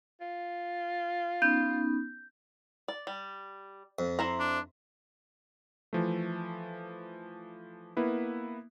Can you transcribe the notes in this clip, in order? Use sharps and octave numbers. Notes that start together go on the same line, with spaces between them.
F4
B3 C#4 D#4 G6
D5
G3
F2
E4 C5 A#5
D4
E3 F3 A3
A#3 B3 E4 B4